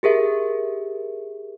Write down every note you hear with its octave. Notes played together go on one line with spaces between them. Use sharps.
G4 G#4 A#4 E5